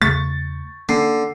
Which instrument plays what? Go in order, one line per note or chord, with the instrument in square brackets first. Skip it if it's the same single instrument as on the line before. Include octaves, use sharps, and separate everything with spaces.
[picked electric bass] E2 C#3 A3 [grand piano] C#6 A6
[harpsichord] D3 [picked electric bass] A#3 C#4 [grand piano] C7